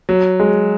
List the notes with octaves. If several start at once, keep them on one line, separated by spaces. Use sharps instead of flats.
F#3
G#3